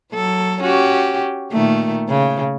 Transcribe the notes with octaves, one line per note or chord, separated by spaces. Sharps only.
F#3 A4
C#4 F#4 G4
A#2 D#3 A3
C#3